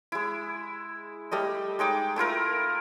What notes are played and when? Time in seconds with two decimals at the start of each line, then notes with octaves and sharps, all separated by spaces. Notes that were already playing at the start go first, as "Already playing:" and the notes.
0.12 G#3 E4
1.31 G3 A3 D#5
1.79 G#3 D#4 G5 D6
2.16 A3 E4 F4 A#4